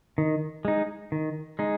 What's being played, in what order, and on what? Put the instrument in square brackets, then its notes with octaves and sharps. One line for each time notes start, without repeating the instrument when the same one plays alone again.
[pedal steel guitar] D#3
G#3 D#4
D#3
G#3 D#4